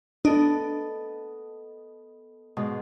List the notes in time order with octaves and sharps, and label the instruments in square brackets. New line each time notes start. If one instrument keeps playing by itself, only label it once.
[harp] B3 A4 D#5 [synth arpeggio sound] D4
[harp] G#2 B2